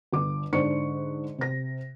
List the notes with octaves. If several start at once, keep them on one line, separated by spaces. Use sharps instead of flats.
G1 D6
G#2 D3 C5 D5 C#6 C#7
C3 A#6